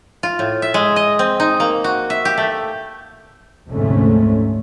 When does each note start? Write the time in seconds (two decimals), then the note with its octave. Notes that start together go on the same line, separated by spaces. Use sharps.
0.23 F4
0.39 A2
0.62 E5
0.74 G#3
0.96 D#5
1.19 C4
1.40 D#4
1.60 A#3
1.84 F#4
2.10 E5
2.25 G4
2.38 A3
3.70 F1 D2 G#2 C3 A3 C#4